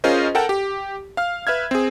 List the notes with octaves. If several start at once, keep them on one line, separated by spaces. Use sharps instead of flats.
C#4 F4 G#4 A#4 C5 D#5
A4 A#4 F#5 G5 A5
G4
F5 F6
B4 E5 F6 G#6
C4 G#4